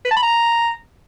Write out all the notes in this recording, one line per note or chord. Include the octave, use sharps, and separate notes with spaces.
B4
A5
B5
A#5